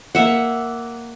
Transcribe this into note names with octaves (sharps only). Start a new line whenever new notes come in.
A#3 E5 F#5